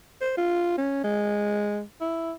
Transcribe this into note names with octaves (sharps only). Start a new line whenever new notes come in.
C5
F4
C#4
G#3
E4